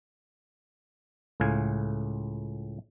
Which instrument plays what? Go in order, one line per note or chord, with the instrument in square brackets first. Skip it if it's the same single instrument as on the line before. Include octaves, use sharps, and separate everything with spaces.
[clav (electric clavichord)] C#2 A2 F5 G#5